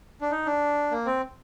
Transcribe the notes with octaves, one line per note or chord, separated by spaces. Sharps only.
D4
D#4
D4
A#3
C4